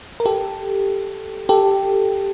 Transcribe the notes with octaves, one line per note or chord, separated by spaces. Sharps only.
A#4
G4 A4
G4 A4